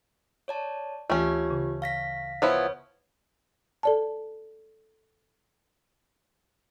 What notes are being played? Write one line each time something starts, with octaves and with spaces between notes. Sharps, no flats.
C#5 D5 A5
D2 E3 A3 C#4 F4 G4
C#3
F5 A#6 B6
F3 B3 E4 B4 C#5
A4 D5 A5